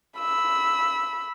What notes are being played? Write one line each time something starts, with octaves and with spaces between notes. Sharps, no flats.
B5 E6